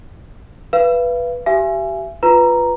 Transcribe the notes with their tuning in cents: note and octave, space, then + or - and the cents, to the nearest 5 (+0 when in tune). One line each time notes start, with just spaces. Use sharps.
B4 -5 F5 -40
G4 -25 E5 +35 G#5 +0
F4 +0 B4 +0 A#5 +0